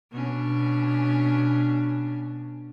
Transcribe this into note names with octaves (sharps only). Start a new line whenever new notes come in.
B2 C#4 D4